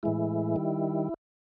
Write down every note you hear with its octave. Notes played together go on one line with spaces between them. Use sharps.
A2 E3 G#3 E4
D#3 G3